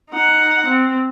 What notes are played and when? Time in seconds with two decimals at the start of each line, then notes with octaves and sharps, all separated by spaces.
0.10 D#4 F#5
0.66 C4